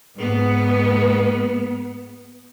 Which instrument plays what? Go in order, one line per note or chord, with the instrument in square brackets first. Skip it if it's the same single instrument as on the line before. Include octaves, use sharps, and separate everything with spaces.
[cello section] G#2 B3